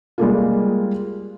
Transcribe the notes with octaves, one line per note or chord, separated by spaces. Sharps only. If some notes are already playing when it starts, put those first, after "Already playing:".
G3 G#3 A#3 F4